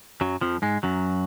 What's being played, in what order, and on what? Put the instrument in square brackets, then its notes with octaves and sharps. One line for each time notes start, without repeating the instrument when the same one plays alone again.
[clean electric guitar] F#2 F#3
F2 F3
G#2 G#3
F#2 F#3